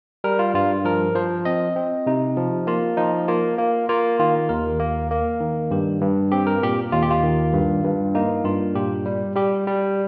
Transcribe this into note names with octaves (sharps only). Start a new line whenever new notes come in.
G3 A#4
F4
G2 F4
F3 A#4
F3 C5
C4 D#5
C4
C3 D#4
F3
A#3 F4
F3 D#4
A#3 F4
A#3
A#3 F4
D#3 F4
D#2 A#4
A#3
A#3
D#3
G2 G4
G2
C4 G4
A#4
A#2 G4
D#2 F4
G4
F4
D#3
G2
G2
A#3 D#4
G2 F4
A#2 G4
G3
G3 G4
G3